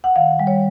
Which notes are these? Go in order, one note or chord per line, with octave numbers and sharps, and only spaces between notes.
F#5
D#3 F5
G3
C#5